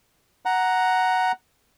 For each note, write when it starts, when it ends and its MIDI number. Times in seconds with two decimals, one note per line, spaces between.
0.45 1.32 78
0.45 1.32 82